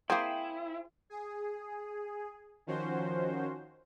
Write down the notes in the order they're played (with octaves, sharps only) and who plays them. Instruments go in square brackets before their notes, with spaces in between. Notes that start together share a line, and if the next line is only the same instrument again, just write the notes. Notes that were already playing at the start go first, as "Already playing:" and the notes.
[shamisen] A#3 C4 [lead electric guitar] E4 [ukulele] G#4 C5 G5
[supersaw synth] G#4
D#3 F3 C#4 F#4 C5